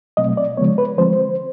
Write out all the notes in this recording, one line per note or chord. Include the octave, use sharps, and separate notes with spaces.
B2 F#3 A3 C4 D#5
D5
C#3 F3 G#3 B3 C#5
B4
D3 F3 G#3 C4 C5